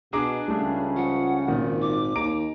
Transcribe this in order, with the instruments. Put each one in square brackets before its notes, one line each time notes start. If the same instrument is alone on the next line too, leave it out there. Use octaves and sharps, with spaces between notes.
[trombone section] B2 [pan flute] D4 [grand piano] G#4 A#5 D6
[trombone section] C#2 C#3 [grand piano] G3 A3 G#4
[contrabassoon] F3 [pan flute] F#5
[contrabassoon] G#1 [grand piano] A#2 D#3
[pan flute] D6
[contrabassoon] D#2 [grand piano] A#5 D7